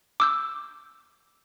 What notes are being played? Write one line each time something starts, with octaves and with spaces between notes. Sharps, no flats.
D6 E6 G6